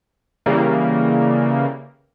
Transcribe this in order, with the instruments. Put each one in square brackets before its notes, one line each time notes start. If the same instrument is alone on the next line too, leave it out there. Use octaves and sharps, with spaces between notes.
[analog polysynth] C#3 E3 G3 A#3